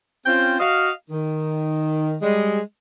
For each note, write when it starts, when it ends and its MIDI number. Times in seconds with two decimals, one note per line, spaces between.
0.26 0.59 60
0.26 0.59 61
0.26 0.59 65
0.26 0.59 72
0.26 0.59 79
0.60 0.90 66
0.60 0.90 75
0.60 0.90 77
1.10 2.16 51
2.22 2.59 55
2.22 2.59 56